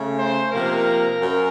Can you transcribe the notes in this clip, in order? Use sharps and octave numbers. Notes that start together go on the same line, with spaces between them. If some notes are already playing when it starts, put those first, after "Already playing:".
Already playing: C#3 A3
C5
C3 F3 A#3 A#4
F#2